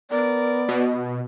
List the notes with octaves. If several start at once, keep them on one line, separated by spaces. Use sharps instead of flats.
B3 A#4 D5
B2 D#5